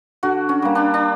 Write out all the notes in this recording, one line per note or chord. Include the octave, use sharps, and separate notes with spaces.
D3 F#4
C#4
G3 A#3
D4
D4